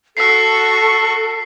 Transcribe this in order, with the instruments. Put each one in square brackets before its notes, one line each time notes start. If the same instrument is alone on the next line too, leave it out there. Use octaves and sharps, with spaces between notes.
[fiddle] F#4 C#6 [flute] A4 [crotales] E6 B6 C7